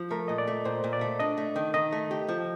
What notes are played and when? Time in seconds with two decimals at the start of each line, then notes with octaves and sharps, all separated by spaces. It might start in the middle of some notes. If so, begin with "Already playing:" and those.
Already playing: F3
0.11 A3 A#4
0.28 A#2 D#5
0.38 D5
0.48 A3
0.65 A#2 C5
0.84 A#2
0.93 D5
1.01 A3
1.20 D4 D#5
1.38 A3
1.56 D#3
1.74 D#3 D#5
1.92 A3
2.11 G4
2.28 F3